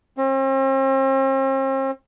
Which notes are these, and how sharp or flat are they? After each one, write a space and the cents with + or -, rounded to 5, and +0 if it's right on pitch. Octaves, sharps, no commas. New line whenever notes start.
C4 +45